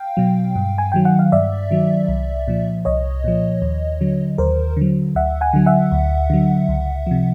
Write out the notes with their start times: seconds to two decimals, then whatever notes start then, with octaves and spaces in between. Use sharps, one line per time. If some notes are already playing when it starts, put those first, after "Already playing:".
Already playing: F5 G5
0.17 B2 F#3
0.56 G2
0.78 G#5
0.92 D#3 F#3 G5
1.05 F#5
1.19 F5
1.32 G2 D5 E5
1.71 D#3 F#3
2.08 C2
2.48 A#2 F3
2.85 C2 C#5 D#5
3.24 A#2 F3
3.62 D#2
4.01 D3 F#3
4.38 D#2 A#4 C5
4.77 D3 F#3
5.15 D2 E5 F#5
5.41 F#5 G#5
5.53 D3 F#3
5.66 E5 F#5
5.92 D2
6.30 D3 F#3
6.69 C#2
7.07 C3 F3